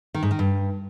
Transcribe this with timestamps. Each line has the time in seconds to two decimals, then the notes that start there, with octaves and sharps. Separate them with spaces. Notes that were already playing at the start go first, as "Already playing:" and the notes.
0.14 D#3
0.23 G#2
0.31 D#3
0.39 G2